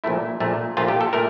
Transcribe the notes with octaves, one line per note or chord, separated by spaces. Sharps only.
A#1 A#2 A3 E4
A#1 A#2 A3
A#1 A#2 A3 F4
G4
A4
A#2 A3 A#4